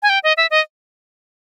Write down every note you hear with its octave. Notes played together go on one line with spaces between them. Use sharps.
G#5
G5
D#5
E5
D#5